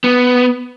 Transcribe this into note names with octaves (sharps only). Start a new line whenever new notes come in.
B3